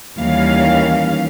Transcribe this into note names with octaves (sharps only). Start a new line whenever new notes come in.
D#2 E3 G3 C#4 F5